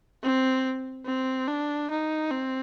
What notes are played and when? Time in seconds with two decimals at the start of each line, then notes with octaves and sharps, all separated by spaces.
0.23 C4
1.06 C4
1.48 D4
1.90 D#4
2.31 C4